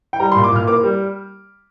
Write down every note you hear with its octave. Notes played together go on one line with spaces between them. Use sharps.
G5
G3 A#5
A#2 C6
D6
A#2 F6
A#3 D6
G3